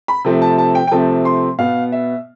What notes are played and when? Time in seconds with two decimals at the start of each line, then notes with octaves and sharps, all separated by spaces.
0.08 B5
0.25 C3 F3 A3 C4
0.42 A5
0.58 A5
0.75 G5
0.87 G5
0.91 C3 F3 A3 C4 A5
1.25 C6
1.59 B2 B3 F5
1.92 E5